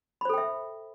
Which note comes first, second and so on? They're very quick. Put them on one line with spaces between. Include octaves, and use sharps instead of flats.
B5 C5 A4 G5 E5